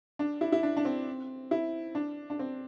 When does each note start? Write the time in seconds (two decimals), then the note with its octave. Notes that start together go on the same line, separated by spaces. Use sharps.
0.19 D4
0.41 E4
0.52 E4
0.63 D4
0.77 D4
0.85 C4
1.51 E4
1.95 D4
2.30 D4
2.39 C4